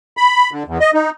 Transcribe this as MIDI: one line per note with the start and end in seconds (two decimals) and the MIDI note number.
0.17 0.50 83
0.52 0.63 50
0.67 0.78 40
0.80 0.91 75
0.94 1.10 63